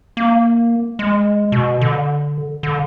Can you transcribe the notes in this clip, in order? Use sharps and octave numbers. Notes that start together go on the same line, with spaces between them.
A#3
G#3
B2
D3
D3